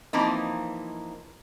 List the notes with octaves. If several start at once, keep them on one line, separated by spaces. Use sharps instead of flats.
E3 F3 A#3 C4 D#4